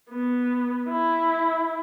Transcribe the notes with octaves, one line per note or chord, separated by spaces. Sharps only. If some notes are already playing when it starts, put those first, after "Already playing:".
B3
E4